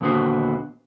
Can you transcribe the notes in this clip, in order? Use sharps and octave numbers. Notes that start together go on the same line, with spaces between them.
D#2 A#2 D3 B3 F#4 C5